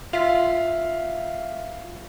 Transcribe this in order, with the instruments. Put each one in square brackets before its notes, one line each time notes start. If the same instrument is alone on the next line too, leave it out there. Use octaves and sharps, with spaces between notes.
[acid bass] F4 [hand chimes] E5 B6 [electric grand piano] F5